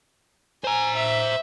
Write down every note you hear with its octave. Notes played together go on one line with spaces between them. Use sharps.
C5 G#5 A#5
E5